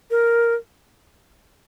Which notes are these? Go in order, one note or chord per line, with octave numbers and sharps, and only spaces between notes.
A#4